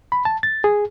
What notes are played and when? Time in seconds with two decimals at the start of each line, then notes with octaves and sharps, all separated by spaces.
0.12 B5
0.25 A5
0.43 A6
0.64 G#4